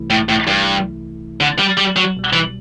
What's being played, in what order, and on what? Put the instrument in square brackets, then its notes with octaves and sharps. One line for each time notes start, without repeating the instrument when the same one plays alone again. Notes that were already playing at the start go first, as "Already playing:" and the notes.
Already playing: [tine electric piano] C2 C3 E3 A3 E4
[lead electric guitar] A2
A2
G2
D3
G3
G3
F#3
[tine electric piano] C2 B2 G3
[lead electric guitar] E3